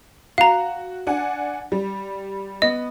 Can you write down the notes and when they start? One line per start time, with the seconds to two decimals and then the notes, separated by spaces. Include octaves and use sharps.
0.38 F#4 F5 A#5
1.07 D4 F#5 G#5
1.72 G3
2.62 B3 D#5